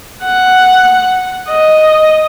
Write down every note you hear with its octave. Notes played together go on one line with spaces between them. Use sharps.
F#5
D#5